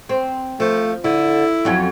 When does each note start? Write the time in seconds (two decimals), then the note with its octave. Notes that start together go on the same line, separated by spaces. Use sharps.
0.09 C4
0.60 F3 A3
1.04 D3 E4
1.65 F2 F#3 C#4